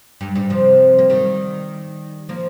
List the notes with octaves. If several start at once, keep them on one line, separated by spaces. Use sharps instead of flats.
G2
G2
C3 F3
A#3
D#3 G3
F3 A#3